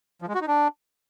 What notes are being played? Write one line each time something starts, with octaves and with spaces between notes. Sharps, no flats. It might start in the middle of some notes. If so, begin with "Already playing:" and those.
F3
G#3
F#4
D#4
D4